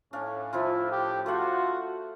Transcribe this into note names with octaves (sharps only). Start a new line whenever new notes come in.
A2 C#4 D4 F5
F3 D4 E4 F4
G4
A3 F4 F#4 C5 F#5